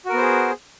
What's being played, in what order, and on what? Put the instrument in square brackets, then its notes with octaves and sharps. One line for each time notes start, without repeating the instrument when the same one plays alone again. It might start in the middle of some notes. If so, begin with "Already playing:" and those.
[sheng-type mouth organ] F#4
A#4
B3
C5
G#4